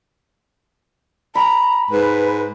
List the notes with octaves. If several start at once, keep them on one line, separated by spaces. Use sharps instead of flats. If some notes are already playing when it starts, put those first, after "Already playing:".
G#5 A#5 B5
G#2 B4